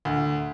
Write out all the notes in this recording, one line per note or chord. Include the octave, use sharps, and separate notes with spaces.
D2